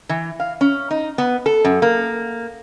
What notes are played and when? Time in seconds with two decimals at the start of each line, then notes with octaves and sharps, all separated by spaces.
0.09 E3
0.40 F5
0.61 C#4
0.91 D#4
1.18 B3
1.46 A4
1.64 F#2
1.82 A#3